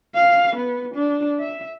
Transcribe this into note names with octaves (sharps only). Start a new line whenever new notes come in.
F5
B3
D4
E5